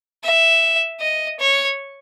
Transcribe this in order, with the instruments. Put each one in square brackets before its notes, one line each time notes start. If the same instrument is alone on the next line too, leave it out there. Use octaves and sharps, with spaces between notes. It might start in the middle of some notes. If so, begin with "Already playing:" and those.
[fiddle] E5
D#5
C#5